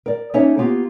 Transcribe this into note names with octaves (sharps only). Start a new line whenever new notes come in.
A#4 D5
A#3 C#4 D#4 A4 C#5 E5
A#3 B3 F4 G4